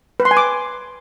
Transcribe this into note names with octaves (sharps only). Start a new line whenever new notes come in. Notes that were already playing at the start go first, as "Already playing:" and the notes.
B4
C6
G#5
D6